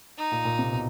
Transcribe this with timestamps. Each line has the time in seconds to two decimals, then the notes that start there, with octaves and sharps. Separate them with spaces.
0.18 D#4
0.32 A#2
0.45 A#2
0.59 C3
0.73 B2